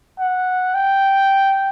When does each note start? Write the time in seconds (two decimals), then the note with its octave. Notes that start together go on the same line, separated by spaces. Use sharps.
0.19 F#5
0.74 G5